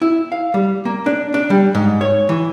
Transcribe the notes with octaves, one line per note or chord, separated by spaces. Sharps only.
E4
F5
G3
A#3
D4
D4
G3
G#2
C#5
E3